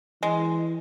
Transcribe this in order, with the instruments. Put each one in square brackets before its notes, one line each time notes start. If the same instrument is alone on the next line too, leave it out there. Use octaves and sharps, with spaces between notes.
[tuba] E3 [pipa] G#3